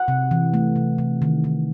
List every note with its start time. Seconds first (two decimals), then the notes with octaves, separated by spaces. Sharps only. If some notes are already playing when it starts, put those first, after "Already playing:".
Already playing: F#5
0.08 C3
0.31 E3
0.54 A3
0.76 C3
0.98 C3
1.22 D#3
1.44 D#3